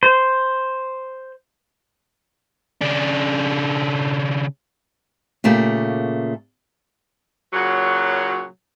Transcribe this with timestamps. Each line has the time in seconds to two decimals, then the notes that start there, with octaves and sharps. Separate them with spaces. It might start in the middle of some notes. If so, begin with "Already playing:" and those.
0.03 C5
2.82 C#3 D4
5.44 A#2 C#3 A3 A#3 G4
7.53 A#2 C#3 F#3